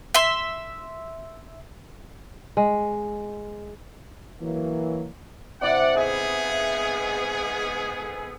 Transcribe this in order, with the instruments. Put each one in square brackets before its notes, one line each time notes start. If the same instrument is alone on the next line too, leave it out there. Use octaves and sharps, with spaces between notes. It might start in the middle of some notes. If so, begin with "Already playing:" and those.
[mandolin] E5 C6
[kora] G#3
[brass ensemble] E3 F#3 A#3
[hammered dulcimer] C3 E4 [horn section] D5 F#5
[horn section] G#2 B3 G#4 [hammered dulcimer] A4 D5 E5
[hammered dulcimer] A4 E5 F5
A4